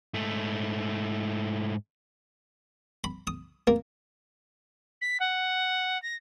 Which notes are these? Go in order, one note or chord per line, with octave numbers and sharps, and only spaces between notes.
G#2 A3
B5
D#6
A#3
B6
F#5
A#6